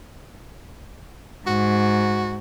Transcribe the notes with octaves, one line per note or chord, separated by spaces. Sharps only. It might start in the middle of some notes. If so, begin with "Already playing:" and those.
G#2 F#4